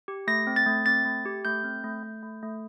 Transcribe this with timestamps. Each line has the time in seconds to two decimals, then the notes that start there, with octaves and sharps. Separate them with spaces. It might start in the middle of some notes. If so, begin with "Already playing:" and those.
0.08 G4
0.27 A3 A#6
0.47 C4
0.56 A6
0.66 A3
0.86 C4 A6
1.05 A3
1.25 G4
1.45 A3 G6
1.64 C4
1.84 A3
2.03 A3
2.23 A3
2.43 A3